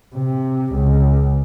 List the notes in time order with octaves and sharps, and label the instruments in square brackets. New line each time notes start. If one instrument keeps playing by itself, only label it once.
[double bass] C3
C#2